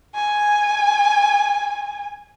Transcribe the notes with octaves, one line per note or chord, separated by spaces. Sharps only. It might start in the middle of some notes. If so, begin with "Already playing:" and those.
G#5